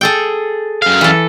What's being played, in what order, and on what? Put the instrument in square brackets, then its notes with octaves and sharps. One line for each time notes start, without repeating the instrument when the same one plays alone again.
[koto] G#4 A4 G5
[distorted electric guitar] F#2 F5
[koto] E3 A4